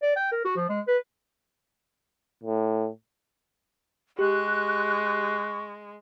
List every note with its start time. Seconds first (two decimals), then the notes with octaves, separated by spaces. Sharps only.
0.02 D5
0.16 G5
0.32 A#4
0.45 F#4
0.56 F3
0.69 G#3
0.87 B4
2.44 A2
4.19 G#3 G4 C#6 F#6